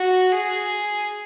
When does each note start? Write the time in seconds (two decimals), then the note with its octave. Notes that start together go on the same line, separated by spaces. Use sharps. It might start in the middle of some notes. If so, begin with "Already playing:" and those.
Already playing: F#4
0.32 G#4